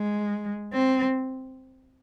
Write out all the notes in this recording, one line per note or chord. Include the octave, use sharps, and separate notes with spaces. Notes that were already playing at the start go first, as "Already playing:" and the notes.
Already playing: G#3
C4